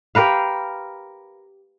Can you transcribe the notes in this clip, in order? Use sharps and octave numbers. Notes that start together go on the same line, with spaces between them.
G4 A#4 B4 F5